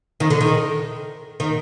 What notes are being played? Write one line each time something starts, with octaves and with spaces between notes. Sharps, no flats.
D#3
D3
D#3
D#3